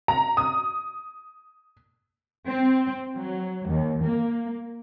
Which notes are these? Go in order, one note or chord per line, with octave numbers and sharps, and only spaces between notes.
A#5
D#6
C4
F#3
D#2
A#3